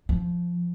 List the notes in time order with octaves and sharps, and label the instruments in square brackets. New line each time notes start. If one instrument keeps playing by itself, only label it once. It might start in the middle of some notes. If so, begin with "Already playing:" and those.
[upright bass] F3